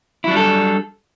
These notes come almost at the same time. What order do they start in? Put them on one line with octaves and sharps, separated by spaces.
E4 F#3 D4 G3 A4